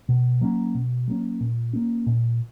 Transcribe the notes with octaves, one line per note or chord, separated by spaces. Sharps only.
B2
F#3 A#3 C#4
B2
F#3 A#3 C#4
A#2
A#3 C#4
A#2